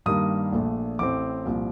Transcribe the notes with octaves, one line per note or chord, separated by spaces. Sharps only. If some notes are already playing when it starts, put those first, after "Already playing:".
G2 D#3 G3 A#3 D#6
A#1 A#2 A3 D4
A1 A2 A3 C4 D6
C2 A#2 F3